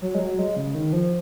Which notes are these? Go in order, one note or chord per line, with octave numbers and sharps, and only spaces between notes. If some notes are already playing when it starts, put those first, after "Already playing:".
F#3
G#3
F#3
G#3
C#3
D#3
F3